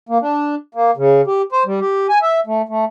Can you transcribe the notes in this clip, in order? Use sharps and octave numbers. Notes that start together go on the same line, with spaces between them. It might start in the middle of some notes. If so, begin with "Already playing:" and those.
A#3
D4
A#3
C#3
G4
C5
G3
G4
G#5
E5
A3
A3